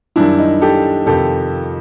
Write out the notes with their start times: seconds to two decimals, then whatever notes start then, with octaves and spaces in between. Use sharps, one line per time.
0.16 F#2 D#3 G3 D4 E4
0.39 D#4
0.61 G4 A4
1.06 F2 C3 D#3 G4 A4